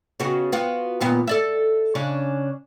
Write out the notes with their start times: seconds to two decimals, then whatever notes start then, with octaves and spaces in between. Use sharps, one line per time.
0.20 C#3 B3 F#4
0.52 B3 F4 F#4
1.00 D#2 A#2 B3
1.27 A4 D5 E5
1.95 C#3 C#4 D4